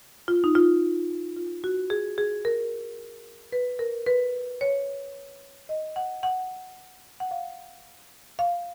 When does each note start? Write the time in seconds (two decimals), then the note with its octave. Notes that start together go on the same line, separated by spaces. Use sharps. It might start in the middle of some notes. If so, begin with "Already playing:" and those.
0.28 F4
0.44 D#4
0.55 F4
1.36 F4
1.64 F#4
1.90 G#4
2.18 G#4
2.45 A#4
3.52 B4
3.79 A#4
4.07 B4
4.61 C#5
5.69 D#5
5.96 F#5
6.23 F#5
7.20 F#5
7.31 F5
8.39 F5